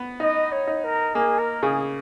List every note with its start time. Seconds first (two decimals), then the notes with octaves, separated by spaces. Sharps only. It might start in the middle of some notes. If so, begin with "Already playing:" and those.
Already playing: B3
0.20 D#4 D#5
0.52 C#5
0.67 D#4
0.84 A#4
1.15 A#3 G#4
1.38 A#4
1.63 C#3 G#4